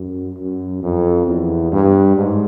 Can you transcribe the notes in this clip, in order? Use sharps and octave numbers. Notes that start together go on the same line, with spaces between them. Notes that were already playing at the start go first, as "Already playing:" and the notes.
Already playing: F#2
F#2
F2
E2
G2
G#2